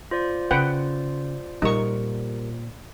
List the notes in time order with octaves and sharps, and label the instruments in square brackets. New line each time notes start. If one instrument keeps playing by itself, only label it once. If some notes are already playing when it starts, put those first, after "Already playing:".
[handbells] F4 C5 D5
[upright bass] C#3 [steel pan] B4 F#5 G5
[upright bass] A#2 [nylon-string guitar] G3 A#4 F#5 [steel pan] D#4 C#6